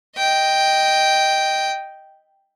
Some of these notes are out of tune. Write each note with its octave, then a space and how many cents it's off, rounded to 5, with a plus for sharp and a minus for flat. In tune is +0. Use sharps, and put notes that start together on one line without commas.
D#5 +0 G5 +0